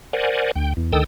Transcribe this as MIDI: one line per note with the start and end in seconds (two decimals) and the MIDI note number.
0.13 0.51 70
0.13 0.51 72
0.13 0.51 74
0.13 0.51 78
0.13 0.51 80
0.56 0.73 38
0.56 0.73 79
0.77 0.92 40
0.93 1.04 38
0.93 1.04 51
0.93 1.04 69
0.93 1.04 79
0.93 1.04 87
0.93 1.04 88